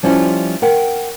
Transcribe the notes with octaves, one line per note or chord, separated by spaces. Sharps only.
F3 G3 C#4 D4 E4 F4
A#4 F#5 G5